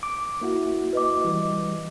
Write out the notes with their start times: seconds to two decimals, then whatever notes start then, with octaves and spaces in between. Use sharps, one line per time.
0.03 D6
0.41 A#3 E4 F#4
0.93 B4 D#5 D6
1.25 E3 G3